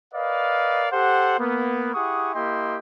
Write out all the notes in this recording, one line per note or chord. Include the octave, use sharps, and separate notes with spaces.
A#4 B4 D5 D#5 F5
G4 A4 C5 F#5
A#3 B3
E4 G4 G#4 F#5 C#6 D#6
A#3 E4 G4 D#5 G5 C6